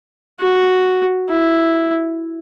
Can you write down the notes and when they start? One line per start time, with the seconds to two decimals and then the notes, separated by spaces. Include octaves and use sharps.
0.40 F#4
1.29 E4